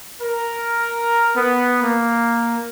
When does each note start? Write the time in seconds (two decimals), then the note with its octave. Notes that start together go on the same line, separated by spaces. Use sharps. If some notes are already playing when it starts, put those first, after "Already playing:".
0.22 A#4
1.36 B3
1.82 A#3